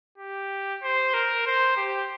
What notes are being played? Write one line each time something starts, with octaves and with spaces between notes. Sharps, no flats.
G4
C5
A#4
C5
G4